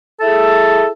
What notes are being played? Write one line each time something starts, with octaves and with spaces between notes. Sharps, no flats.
E4 G#4 A4